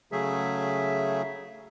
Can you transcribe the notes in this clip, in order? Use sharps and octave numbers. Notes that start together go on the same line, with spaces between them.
C#3 F#3 A3 G#4 E5